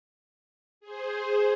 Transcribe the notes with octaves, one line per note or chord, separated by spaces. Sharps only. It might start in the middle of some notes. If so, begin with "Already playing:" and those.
G#4 C5